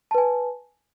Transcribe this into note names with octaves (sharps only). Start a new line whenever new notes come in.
B4 G#5 A5